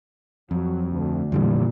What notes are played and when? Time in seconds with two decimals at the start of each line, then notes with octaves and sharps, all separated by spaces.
0.51 F2 F#3
0.93 D2
1.32 F2 A#2 D3 E3 G3